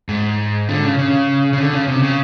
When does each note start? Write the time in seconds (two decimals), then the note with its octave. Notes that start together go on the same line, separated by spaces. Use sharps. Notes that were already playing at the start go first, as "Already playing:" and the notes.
0.09 G#2
0.69 D3
0.84 C#3
0.99 C#3
1.53 C#3
1.58 D3
1.73 C#3
1.88 C3
2.03 C#3